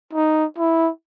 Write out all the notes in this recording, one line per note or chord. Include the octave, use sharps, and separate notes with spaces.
D#4
E4